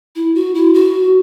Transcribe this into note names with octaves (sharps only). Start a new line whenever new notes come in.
E4
F#4
E4
F#4